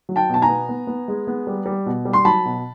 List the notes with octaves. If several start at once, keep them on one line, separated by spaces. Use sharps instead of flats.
F#3
G5 A5
B2 A5
G#5 A#5
B3
B3
B3
G#3
B3
G3
G3
B2
G3
C6
F#3 A5 B5
B2